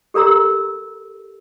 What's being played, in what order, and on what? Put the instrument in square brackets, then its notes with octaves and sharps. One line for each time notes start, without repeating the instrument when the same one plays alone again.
[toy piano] G4 A4 A#4 A#5 E6